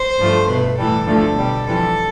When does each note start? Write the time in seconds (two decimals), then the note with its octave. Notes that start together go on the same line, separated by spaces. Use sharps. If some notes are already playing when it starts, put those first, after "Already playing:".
Already playing: C5
0.19 G2 F3 A3
0.48 B2 A3 B4
0.77 A2 E3 G3 A4
1.07 D2 D3 F3 A3 A4
1.36 B2 G3
1.66 F2 E3 G3 A4